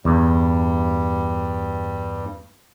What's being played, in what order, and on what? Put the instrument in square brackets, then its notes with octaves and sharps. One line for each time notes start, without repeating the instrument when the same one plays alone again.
[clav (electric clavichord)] E2 [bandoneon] G2 G3